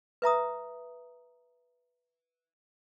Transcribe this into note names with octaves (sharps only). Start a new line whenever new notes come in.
B4 E5 A#5 D#6